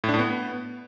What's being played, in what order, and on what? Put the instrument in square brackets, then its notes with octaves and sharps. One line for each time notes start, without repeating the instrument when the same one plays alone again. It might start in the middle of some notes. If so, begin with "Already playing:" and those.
[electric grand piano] A2
D4
A2
B3